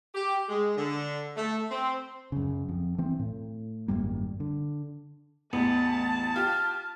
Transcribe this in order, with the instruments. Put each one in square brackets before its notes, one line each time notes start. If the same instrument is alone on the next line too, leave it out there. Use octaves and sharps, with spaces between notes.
[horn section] G4
G#3
D3
A3
C4
[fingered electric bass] F#2 C#3
F2
E3 C4
A2
G#1 F#2 G3 A#3
D3
[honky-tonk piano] A1 E2 [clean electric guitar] B3 [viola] A5
[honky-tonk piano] F4 G4 [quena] F6